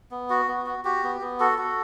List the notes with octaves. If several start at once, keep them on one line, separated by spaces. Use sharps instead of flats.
B3
F#4
B3
F#4
F#4 G4
B3
B3
F#4 A4
F#4